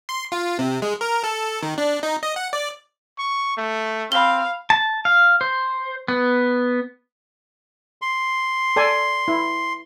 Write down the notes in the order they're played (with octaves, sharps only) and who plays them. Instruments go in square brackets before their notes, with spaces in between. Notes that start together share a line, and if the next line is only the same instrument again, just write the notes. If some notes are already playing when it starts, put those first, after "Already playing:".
[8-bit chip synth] C6
F4
C3
G#3
A#4
A4
D#3
D4
D#4
D#5
F#5
D5
[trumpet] C#6
A3
[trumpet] C4 [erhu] F5 [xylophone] B5 G7
[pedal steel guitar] A5
F5
C5
B3
[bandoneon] C6
[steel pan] A4 D5 G#5
E4